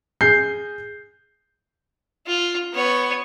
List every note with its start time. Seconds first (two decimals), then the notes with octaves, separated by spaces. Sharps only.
0.21 G#4 G6 C7
2.27 F4
2.73 B3 C#5